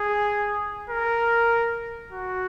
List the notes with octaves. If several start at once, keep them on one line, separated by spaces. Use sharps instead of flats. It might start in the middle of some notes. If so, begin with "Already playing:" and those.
Already playing: G#4
A#4
F#4